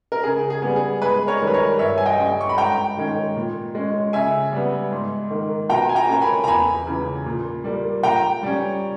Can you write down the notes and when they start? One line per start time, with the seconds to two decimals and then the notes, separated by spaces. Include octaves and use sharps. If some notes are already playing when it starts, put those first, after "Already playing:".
0.12 A#4
0.23 C#3 G#4
0.50 G#4
0.62 G3 B3
0.76 G#4
1.01 G#2 G#4 B4
1.27 A#4 C#5
1.40 D#3 G3
1.47 B4
1.54 A#4 C#5
1.79 G2 C#5 E5
1.98 G#5
2.06 D#5 G5
2.18 G3 C#4
2.41 C#6
2.49 B5
2.58 G#2 G5 A#5
2.97 D#3 G#3 C#4
3.36 A#2
3.75 G#3 C#4
4.13 C#3 E5 G#5
4.52 G3 B3
4.91 G#2
5.30 D#3 A#3
5.70 B2 G5 A#5
5.89 G#5
5.95 G5 A#5
6.09 A#3 C#4 A#5
6.22 G#5 B5
6.44 A#5
6.47 E2 G#5 B5
6.87 C#3 E3
7.26 A#2
7.64 G3 A#3
8.03 A#2 G5 A#5
8.43 G3 C#4